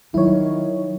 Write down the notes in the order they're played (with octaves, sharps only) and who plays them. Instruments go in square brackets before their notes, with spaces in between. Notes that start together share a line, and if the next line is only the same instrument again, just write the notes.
[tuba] D#3 [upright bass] F#3 [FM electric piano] E4 C#5